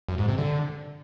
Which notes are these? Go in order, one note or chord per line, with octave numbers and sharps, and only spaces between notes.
F#2
G#2
C3
D3